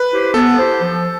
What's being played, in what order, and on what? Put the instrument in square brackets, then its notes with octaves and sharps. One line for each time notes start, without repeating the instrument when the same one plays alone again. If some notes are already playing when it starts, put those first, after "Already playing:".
Already playing: [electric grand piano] B4
[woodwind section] E4 G4 C5
[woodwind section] B3 [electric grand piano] A4
[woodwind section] E4 G4 C5
F3